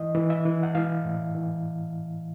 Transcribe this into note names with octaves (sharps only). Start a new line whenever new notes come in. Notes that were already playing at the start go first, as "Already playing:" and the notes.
Already playing: E3 D#5
E3
E5
E3
F#5
E3 F5
A2
E3